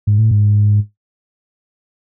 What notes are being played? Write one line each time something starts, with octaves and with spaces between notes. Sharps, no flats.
G#2
A2
G#2